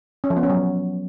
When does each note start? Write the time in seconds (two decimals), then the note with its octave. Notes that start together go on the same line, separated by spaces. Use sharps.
0.24 C#4
0.30 F3
0.37 B3
0.43 C#4
0.50 F#3